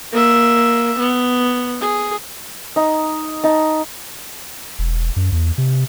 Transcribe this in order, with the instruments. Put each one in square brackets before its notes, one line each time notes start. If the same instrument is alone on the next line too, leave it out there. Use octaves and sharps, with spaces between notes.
[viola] A#3 E5
B3
G#4
[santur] D#4
D#4 A5
[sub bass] E1
F#2
E2
C3